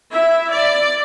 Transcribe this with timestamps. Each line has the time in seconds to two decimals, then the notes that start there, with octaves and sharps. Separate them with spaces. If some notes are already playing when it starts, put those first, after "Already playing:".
0.11 E4 E5
0.51 D5